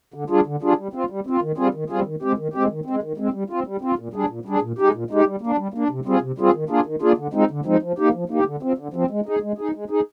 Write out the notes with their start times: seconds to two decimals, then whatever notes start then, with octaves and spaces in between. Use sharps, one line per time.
0.14 D3
0.30 G3 D4 F4 G#4
0.46 D3
0.62 G3 D4 F4 G#4
0.78 G3
0.94 C4 F4
1.10 G3
1.27 C4 F4
1.42 D#3
1.58 G3 C4 F4 G#4
1.74 D#3
1.90 G3 C4 F4 G#4
2.05 D#3
2.22 G#3 C4 G4
2.38 D#3
2.54 G#3 C4 G4
2.70 D#3
2.85 G#3 C4
3.03 D#3
3.18 G#3 C4
3.33 G3
3.50 C4 F4
3.67 G3
3.81 C4 F4
3.98 A#2
4.14 G3 D4 G#4
4.29 A#2
4.45 G3 D4 G#4
4.62 A#2
4.79 G#3 D#4 G4
4.94 A#2
5.11 G#3 D#4 G4
5.26 G3
5.41 A#3
5.47 D4
5.58 G3
5.74 A#3 D4
5.90 C3
6.05 G3 C4 F4 G#4
6.22 C3
6.38 G3 C4 F4 G#4
6.54 D#3
6.69 A#3 D4 F4 G#4
6.86 D#3
7.02 A#3 D4 F4 G#4
7.17 D3
7.33 F3 G#3 C4 D#4
7.51 D3
7.65 F3 G#3 C4 D#4
7.82 F3
7.99 A#3 D#4 G4
8.14 F3
8.29 A#3 D#4 G4
8.46 D3
8.63 F3 C4
8.78 D3
8.94 F3 C4
9.11 G#3
9.26 D#4 G#4
9.42 G#3
9.58 D#4 G#4
9.75 G#3
9.90 D#4 G#4